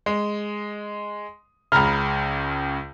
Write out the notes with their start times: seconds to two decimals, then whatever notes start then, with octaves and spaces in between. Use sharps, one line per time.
0.06 G#3
1.72 C#2 C#3 A#5 B5 F6